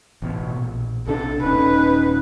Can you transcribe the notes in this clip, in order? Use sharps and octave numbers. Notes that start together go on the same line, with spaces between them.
A1 B2
A#1
B1 C3 D4 A4
D#1 C#4 D#4 B4